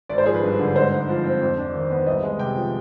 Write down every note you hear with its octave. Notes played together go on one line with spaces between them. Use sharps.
G#1 D5
C5
F3 G#4
B4
G2
D3
G#2 C5
G#2
F3
C4
F2
D4
D#3
B3
C2 D#5
G#3
C3 G5
F3